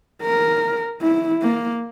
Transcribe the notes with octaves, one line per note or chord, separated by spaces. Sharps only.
A#4
E4
A#3